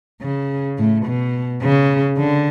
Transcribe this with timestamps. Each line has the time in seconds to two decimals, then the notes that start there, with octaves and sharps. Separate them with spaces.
0.21 C#3
0.78 A2
1.05 B2
1.63 C#3
2.18 D3